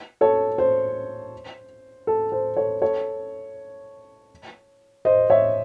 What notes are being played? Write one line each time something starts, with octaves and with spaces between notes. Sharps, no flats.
A4 C#5
C5
A4
C5
A4 C#5
A4 C#5
C5 D#5
C#5 E5